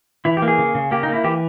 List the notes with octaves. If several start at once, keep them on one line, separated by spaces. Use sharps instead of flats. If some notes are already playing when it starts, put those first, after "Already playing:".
E3 E4
G4
A#3
G#4
C#3
C#3
A#3 G4
D#4
A#3
E4
E3 G4